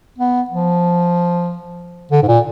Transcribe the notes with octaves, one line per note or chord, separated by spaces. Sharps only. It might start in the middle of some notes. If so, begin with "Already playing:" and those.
B3
F3
D3
G#2
A#2